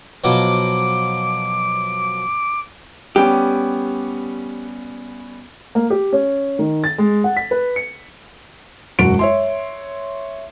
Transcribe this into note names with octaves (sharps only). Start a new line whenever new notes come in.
B2 F3 F#3 D6
G3 B3 C#4 G4
A#3
G4
C#4
D#3
A6
G#3
F#5
B6
B4
C#7
E1 F#2 F#4 D7
C#5 E5 C6